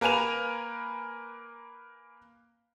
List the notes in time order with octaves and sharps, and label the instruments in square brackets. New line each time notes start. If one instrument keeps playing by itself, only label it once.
[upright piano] A#3 A#4 B4 G#5 D#7 F7